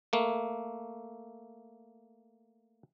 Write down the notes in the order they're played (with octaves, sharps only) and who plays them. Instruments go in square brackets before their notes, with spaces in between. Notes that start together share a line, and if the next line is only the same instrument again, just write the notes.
[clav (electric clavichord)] A3 A#3